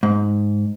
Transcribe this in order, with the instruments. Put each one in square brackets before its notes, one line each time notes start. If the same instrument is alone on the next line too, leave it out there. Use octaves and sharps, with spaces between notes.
[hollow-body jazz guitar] G#2